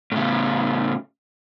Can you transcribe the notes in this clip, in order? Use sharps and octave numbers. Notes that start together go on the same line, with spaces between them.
A2 C#3